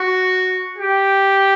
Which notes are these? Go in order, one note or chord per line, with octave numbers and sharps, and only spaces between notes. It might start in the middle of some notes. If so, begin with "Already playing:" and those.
Already playing: F#4
G4